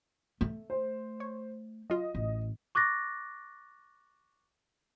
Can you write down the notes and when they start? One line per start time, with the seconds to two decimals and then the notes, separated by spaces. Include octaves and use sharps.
0.41 A3
0.70 C5
1.20 C#5
1.90 F#3 F4 D#5
2.15 A1
2.75 C#6 D6 F#6 A6 A#6